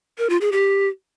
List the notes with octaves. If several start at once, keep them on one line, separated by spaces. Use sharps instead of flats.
A#4
F4
G#4
G4